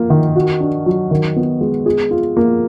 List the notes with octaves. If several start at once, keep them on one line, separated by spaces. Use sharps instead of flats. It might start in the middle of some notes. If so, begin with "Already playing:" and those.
Already playing: A#3 F4
D#3
F#4
D4
F#3
D#3
B3
G#3
G#4
F4
A#3